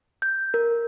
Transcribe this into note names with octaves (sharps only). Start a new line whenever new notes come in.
G6
A#4